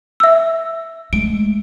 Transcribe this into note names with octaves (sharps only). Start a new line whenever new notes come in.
E5 E6
G#3 A3 D7